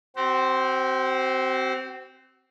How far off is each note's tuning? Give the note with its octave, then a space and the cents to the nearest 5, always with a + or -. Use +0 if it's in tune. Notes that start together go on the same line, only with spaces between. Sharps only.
C4 +0 F#4 +45 C5 +0